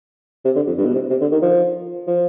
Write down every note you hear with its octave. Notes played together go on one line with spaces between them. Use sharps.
C3
D3
F2
G2
B2
C3
C3
D3
D#3
F3
F3